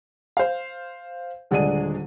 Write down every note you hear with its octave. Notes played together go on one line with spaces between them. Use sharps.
C5 F5
D#1 D3 G#3 D4 G#4 D#7